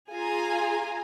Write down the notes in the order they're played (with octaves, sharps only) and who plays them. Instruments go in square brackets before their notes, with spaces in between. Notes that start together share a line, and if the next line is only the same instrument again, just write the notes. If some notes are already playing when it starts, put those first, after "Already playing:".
[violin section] F4 G#4 G#5 A#5